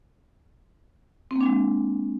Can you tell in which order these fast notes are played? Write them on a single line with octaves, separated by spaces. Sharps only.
C4 A#3 D4 G#3